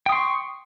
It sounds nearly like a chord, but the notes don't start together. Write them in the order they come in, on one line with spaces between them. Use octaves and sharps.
G5 D#6 C6 C#6